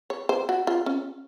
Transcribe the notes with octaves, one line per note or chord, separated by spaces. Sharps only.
C#5
C5
F#4
F4
C#4